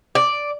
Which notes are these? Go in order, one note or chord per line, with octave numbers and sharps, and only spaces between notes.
D5